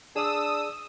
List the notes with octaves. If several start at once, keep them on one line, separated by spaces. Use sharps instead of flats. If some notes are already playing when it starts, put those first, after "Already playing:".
D4 G#4 D5 D#6 E6